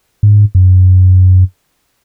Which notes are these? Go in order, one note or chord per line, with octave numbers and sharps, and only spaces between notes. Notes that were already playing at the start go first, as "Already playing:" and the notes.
G#2
F#2